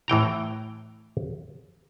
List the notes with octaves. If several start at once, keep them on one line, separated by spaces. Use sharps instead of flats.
A2 E3 G5 A#5